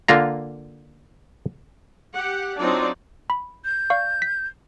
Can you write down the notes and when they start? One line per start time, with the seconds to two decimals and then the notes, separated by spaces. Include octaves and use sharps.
0.08 D3 A#3 F4 A#5
2.14 G4 F#5
2.59 F#3 C4 D4 D#4 F4 D5
3.30 B5
3.65 G6
3.90 D5 F5 C#6
4.22 B6